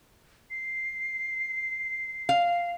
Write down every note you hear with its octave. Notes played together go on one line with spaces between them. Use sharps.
C7
F5